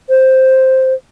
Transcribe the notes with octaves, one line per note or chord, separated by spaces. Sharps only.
C5